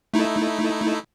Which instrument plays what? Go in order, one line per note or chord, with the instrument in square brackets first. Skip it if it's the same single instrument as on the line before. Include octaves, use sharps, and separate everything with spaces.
[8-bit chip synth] A3 D#4 E4